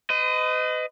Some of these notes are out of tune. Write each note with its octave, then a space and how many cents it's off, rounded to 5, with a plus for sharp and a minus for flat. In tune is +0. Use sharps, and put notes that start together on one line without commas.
B4 +45 D#5 +0